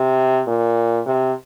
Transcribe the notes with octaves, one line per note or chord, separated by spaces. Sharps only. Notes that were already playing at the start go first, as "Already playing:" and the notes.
Already playing: C3
A#2
C3